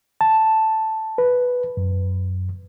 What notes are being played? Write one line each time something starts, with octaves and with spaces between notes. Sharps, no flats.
A5
B4
F#2